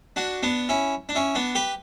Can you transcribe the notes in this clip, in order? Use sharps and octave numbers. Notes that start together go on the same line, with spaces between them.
D4 F#4
B3 D4
C#4 E4
D4
C#4 E4
B3 D4
G4 B4